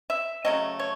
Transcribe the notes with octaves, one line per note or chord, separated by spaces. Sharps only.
E5
C#3 F#3 A3 D#5
C#5